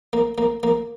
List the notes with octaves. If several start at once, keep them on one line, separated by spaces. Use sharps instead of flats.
A#3
A#3
A#3